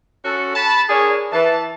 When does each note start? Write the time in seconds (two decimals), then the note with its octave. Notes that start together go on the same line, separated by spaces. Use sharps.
0.25 C#4 F#4 A4
0.55 A5 B5
0.89 D4 G#4 A#4 C#5
1.32 E3 A5